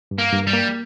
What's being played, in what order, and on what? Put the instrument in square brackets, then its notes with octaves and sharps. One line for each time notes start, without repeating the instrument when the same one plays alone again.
[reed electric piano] G2
[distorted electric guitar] A#3
[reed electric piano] G2
[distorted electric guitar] G3
[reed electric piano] A#3